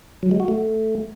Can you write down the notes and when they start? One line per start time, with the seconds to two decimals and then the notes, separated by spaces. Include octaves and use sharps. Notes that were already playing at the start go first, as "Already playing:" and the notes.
0.23 F#3
0.31 G#3
0.40 F#4
0.48 A3